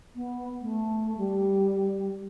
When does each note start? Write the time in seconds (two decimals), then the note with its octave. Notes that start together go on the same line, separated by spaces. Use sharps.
0.15 B3
0.62 A3
1.18 G3